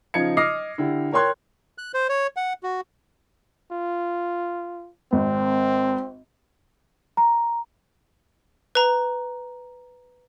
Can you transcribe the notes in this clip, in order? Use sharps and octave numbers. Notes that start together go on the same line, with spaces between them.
C#3 F3 D#4 F5 G#6 C#7
D#5 D6 D#6 F6 A#6 C7
D3 E4 G4
A#4 C#5 G5 C6 F#6 G#6
F#6
C5
C#5
F#5
F#4
F4
G#1 C4
A#5
B4 A#5